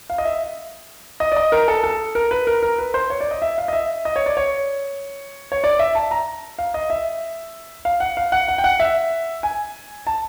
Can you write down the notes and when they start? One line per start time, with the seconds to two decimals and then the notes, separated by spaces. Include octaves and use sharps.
0.10 F5
0.18 D#5
0.25 E5
1.20 D#5
1.32 D5
1.36 D#5
1.52 A#4
1.68 A4
1.84 A4
2.15 A#4
2.31 B4
2.47 A#4
2.63 A#4
2.78 B4
2.94 C5
3.10 C#5
3.21 D5
3.31 D#5
3.42 E5
3.58 F5
3.68 D#5
3.73 E5
4.05 D#5
4.16 C#5
4.26 D5
4.37 C#5
5.52 C#5
5.64 D5
5.79 E5
5.95 A5
6.11 A#5
6.58 F5
6.74 D#5
6.90 E5
7.85 F5
8.00 F#5
8.17 F5
8.32 F#5
8.48 F#5
8.58 G5
8.64 F#5
8.80 E5
9.43 G#5
10.07 A5